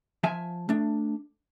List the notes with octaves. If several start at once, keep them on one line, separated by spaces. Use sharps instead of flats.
F3 E5 G#5
A3 D4